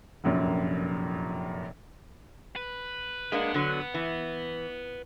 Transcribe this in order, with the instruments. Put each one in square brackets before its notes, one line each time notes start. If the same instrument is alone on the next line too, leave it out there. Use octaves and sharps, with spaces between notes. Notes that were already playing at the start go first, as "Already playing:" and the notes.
[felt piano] F1 A#1 F#2 A#2
[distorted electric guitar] B4
[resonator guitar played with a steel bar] G#3 A#3 D4 [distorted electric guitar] B4 F#5
[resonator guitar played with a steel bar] D3 F#3
E3